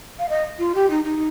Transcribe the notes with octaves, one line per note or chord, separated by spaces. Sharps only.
F5
D#5
F4
G4
D#4
D#4